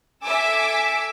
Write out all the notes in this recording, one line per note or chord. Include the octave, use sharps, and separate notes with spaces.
A4 E5 G#5 D6 E6